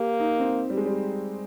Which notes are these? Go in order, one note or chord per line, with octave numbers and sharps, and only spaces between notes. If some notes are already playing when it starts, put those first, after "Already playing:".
Already playing: A#3 G4
D#4
C4
G3
G#3
G3